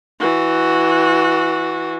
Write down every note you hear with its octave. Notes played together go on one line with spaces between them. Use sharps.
E3 F#4